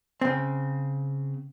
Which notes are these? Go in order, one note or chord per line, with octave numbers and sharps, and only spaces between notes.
C#3 C4